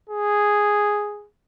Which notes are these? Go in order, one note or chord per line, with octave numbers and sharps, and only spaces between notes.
G#4